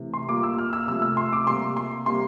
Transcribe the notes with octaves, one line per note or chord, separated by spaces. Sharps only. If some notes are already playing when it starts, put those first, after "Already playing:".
Already playing: C3 E3 A3
C6
A#2 G3 A#3 D6
E6
F6
E6
C3 F3 A3 E6
E6
C6
D6
C3 G3 A#3 C6
C6
C3 G3 A#3 C6